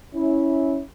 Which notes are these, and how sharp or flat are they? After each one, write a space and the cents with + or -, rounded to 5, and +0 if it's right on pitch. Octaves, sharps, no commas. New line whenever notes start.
C#4 +0 E4 -15